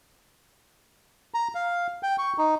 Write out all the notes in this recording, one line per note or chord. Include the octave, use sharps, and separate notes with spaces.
A#5
F5
G5
C#6
D#4